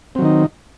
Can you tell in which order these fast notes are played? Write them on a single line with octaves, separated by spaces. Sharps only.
C4 F#3 D#3 D#4